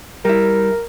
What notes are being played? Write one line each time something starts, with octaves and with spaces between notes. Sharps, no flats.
G3 E4 A#4